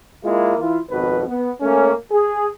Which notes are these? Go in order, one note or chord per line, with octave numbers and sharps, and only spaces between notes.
G#3 A#3 E4 F4
E3 E4 F4
G#1 F2 B2 B4
B3
A3 A#3 C#4
G#4